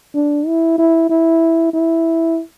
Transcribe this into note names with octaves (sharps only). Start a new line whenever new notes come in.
D4
E4
E4
E4
E4